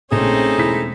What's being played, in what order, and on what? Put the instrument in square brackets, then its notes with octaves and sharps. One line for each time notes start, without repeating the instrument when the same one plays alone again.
[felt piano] A#1 [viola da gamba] A3 C4 C#4 [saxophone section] D#4 G#4 A4
[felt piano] E1 E4 B6